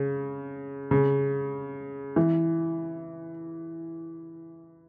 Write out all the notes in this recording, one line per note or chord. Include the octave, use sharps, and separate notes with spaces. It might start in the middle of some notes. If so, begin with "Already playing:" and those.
Already playing: C#3
C#3
E3